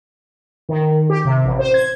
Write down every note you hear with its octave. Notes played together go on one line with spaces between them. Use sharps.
D#3
G4
C3
A1
C5
G#6